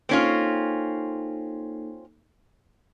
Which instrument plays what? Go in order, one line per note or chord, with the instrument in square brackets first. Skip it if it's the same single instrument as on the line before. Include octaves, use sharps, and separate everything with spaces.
[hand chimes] A#3 D#4 A4 [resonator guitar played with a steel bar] C4 C#4 F4